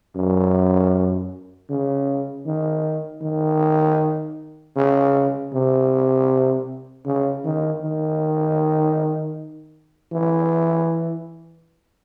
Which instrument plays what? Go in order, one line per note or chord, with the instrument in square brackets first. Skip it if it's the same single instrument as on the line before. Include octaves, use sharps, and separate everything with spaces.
[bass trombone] F#2
C#3
D#3
D#3
C#3
C3
C#3
D#3
D#3
E3